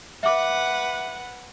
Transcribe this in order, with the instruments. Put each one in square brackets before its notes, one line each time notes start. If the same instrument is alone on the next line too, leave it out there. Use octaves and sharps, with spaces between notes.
[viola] B4 F#5 [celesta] E5 D6